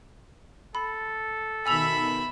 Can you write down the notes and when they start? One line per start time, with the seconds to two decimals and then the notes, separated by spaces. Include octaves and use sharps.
0.75 A4 B5
1.66 B2 D#3 E5 G#5 B5 E6 F7